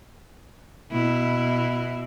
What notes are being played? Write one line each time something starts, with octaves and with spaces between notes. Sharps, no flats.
B2 E4